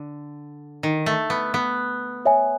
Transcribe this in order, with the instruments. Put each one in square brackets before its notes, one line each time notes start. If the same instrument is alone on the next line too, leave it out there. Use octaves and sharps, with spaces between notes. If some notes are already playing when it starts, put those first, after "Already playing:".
Already playing: [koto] D3
D#3
A3
B3
B3
[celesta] C#5 E5 G#5